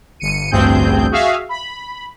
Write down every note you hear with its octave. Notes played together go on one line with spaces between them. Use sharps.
G1 C#7 D#7
A1 D2 G2 C4 G#4 G6
F#4 G#4 E5 F5
B5